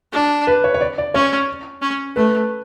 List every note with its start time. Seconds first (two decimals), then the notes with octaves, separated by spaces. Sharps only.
0.13 D4
0.47 B4
0.64 C#5
0.74 C#5
0.81 D5
0.98 D5
1.14 C#4 C#5
1.82 C#4
2.16 A3 B4